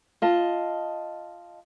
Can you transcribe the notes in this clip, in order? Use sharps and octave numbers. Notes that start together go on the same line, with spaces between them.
F4 D#5 A5